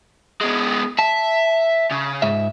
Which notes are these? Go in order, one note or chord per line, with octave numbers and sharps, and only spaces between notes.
G#3 B3
E5 A5
C#3
G#2 E5